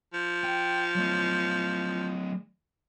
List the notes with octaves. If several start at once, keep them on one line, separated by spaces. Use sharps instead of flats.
F3
G5
F#3 A3